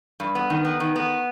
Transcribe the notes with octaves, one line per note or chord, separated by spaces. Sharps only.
G2
B3
D#3
B3
D#3
B3